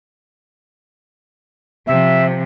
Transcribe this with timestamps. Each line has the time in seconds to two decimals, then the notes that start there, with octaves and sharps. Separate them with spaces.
1.87 C3 F3 E5